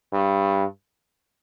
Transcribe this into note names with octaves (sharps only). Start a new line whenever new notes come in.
G2